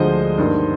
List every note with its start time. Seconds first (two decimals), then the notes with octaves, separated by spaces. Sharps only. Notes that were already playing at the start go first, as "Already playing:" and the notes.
Already playing: D2 D3 F3 G#3 C5 D#5
0.38 G2 D#3 A#3